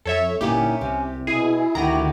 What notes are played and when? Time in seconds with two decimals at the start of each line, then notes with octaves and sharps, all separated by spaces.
0.05 F2 A4 C#5 E5
0.41 G1 A#2 C#4 D#4 E4 G4
0.81 C2 C3
1.27 B2 E4 G#4
1.75 D2 D#3 E4 F#4 G4 A#5 A#6